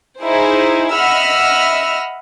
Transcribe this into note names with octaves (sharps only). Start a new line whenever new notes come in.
D#4 E4 G#4 C5
D#5 E5 F#5 B5 E6 F6